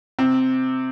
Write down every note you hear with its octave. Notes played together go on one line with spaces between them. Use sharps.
C3 C4